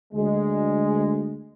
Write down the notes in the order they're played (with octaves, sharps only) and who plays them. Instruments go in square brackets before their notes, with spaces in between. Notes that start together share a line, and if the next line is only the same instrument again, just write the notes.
[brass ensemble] D2 G#3